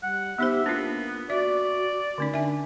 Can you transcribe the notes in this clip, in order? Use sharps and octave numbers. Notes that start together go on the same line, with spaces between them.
G3 F#5
B3 D#4 G4 C5 E5
A#3 B3 D4 F4
F#4 D5 E5
D3 A3 C#4 D#4
D4 E5 G#5